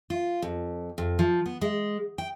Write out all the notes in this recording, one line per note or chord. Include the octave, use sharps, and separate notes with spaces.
F4
F2
F2
F3
B3
G#3
G5